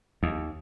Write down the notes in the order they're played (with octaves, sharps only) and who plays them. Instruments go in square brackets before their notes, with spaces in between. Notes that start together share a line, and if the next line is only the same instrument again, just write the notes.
[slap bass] D#2